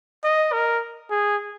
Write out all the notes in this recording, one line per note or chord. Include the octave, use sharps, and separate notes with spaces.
D#5
A#4
G#4